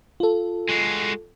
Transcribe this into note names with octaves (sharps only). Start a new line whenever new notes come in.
F4 A4
G#3 F#4